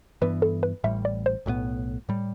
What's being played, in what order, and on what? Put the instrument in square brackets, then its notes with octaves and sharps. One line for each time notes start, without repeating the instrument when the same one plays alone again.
[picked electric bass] G2 E3 B3 [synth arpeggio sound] B4
[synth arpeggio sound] A4
B4
[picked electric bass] A1 A2 G3 [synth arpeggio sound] E5
[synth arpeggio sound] D5
C5
[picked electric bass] B1 A2 G3 B3
A2 G3